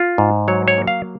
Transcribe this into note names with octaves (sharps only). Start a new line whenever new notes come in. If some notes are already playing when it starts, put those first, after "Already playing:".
Already playing: F4
G#2
F#3 C#5
C#5
A#3
F5